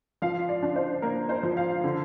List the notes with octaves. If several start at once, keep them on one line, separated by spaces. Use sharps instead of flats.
F3 F5
D5
D4
C5
A#3 A#4
C5
F3
F5
D3